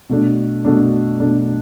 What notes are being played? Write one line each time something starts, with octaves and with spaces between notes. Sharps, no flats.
B2 A3 D4
B2 A3 D4
B2 A3 D4